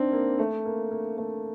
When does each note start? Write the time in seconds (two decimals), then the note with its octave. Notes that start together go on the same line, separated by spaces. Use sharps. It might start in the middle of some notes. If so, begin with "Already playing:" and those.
Already playing: C4 D4 D#4
0.12 A#3
0.39 A3
0.66 A#3
0.91 A#3
1.18 A3